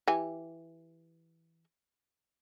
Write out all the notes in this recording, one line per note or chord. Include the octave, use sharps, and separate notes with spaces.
E3 G4 G#5